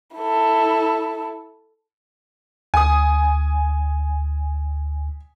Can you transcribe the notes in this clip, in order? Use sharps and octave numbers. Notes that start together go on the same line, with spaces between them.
E4 A4
D2 G#5 D#6